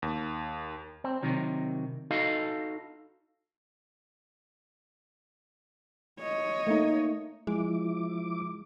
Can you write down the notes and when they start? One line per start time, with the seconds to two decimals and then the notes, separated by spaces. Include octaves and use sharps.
0.02 D#2
1.04 C4
1.23 C3 D#3 F#3
2.11 D#4 F#4 A4 D#5 F5
6.19 C#5 D#5
6.67 A3 A#3 D#4
7.47 F3 G#3 E4 D6